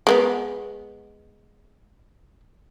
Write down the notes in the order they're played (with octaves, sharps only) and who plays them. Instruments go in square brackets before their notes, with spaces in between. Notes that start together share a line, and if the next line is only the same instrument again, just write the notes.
[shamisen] G#3 A#3 B3